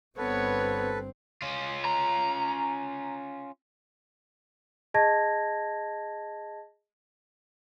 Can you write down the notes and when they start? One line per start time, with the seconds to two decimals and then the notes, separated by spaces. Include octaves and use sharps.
0.18 G1 B3 C4 A4 B4 C#5
1.42 C#4 F4
1.85 A#5
4.94 G#4 D#5 A5 G#6 A#6